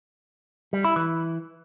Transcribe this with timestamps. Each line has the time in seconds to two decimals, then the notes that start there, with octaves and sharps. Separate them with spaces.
0.73 G3
0.84 E4
0.96 E3